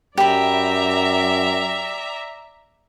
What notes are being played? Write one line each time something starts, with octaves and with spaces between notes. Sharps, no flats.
F#2 G4 D5 E5 A#5 B5